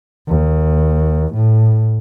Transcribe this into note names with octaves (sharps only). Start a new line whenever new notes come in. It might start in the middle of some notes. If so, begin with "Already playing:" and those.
D#2
A2